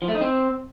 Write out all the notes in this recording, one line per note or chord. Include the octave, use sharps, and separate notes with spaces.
F3
A3
D#4
C4